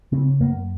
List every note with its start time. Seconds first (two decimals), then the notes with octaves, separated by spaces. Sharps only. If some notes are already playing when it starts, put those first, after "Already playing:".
0.12 C#3 C4
0.40 F#2 A#3